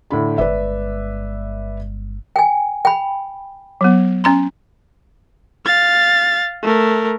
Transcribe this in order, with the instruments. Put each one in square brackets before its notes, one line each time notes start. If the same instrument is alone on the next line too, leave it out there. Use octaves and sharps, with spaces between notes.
[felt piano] A2 D3 B5
[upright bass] G1 G#3 [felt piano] B4 D5 E5
[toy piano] G5 G#5
G5 B5
[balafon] F#3 B3
C#4 A#5 C6
[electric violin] F5 A6
A3 A#4